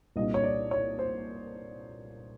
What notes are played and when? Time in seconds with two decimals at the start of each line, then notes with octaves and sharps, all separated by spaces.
0.16 C2 A#2 G3 A#3 D4 D#5
0.34 C#5
0.44 D5
0.71 C#5
0.99 C5